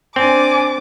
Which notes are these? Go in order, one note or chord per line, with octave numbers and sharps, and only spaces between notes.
C4 D4 G#5 D6